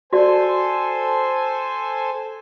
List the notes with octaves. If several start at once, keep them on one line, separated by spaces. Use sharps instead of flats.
F#4 A4 C5 D5 G#5